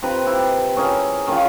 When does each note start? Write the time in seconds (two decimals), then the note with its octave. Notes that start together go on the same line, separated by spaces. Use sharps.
0.03 C3 B4 A#5 B5
0.27 E4 G4
0.77 C#4 G#4 A#4
1.28 D#3 C#4 F4